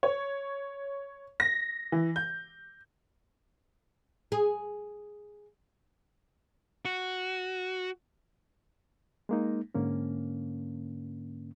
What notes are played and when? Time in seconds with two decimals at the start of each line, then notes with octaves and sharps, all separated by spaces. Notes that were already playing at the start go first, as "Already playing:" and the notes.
0.03 C#5
1.40 A#6
1.92 E3
2.16 G6
4.32 G#4
6.85 F#4
9.29 G#3 A#3 D#4
9.75 G#2 D3 A#3 C#4